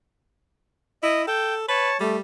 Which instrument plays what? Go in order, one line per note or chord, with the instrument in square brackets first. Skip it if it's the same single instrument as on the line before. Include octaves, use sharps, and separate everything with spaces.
[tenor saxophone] E4 [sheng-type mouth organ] D#5
[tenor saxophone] A4 [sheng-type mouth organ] G5
[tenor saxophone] B4 [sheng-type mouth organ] C#5 A5
[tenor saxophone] G3 [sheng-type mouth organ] A3